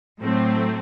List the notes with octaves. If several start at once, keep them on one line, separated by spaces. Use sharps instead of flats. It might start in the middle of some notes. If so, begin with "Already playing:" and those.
A2 F#3 A3 C4